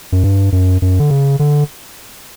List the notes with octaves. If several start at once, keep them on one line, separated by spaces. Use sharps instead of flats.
F#2
G2
F#2
F#2
D3
C#3
D3